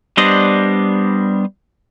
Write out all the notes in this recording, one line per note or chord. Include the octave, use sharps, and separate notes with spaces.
G3 B3 D4 C5 D#5